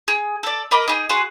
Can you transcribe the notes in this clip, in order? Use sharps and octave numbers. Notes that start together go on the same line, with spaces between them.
G#4
A4 D5
A#4 D#5 B5 D6
D#4 G#4
F#4 G#4 F#5 C6